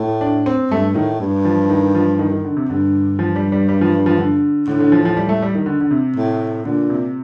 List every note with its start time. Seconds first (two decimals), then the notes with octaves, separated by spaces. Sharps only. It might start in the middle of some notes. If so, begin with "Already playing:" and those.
Already playing: A2
0.21 D4
0.46 C4
0.71 G2 A3
0.95 A2 D#3
1.20 G2
1.45 F3
1.69 D#3
1.95 F3
2.19 D#3
2.32 D#3
2.44 D3
2.57 C3
2.69 G2 D3
3.19 F3
3.36 G3
3.52 G3
3.69 G3
3.81 F3
4.06 F3
4.18 D3
4.68 A2 D3
4.80 D3
4.92 F3
5.05 F3
5.17 G3
5.29 A3
5.42 G3
5.55 D#3
5.66 D3
5.81 D3
5.91 C3
6.16 A2
6.65 A#2 D3
6.90 C3